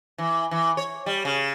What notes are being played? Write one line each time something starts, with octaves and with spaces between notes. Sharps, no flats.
E3
E3
C#5
G3
C#3